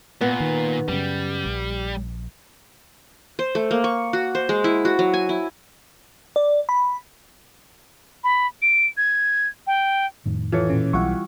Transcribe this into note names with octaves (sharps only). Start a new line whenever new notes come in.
A#2 B3
D#3
F#2 C#3 G3
A#1
C5
A3
A#3
C#6
F#4
C5
G#3
E4
F#4
F#3
G#5
E4
D5
B5
B5
D7
G#6
G5
F2 A2 D#3
E3 F4 A4 C#5
A#2 C#4
B1 F#3 G3 C4 E4 F4 F#5 C#6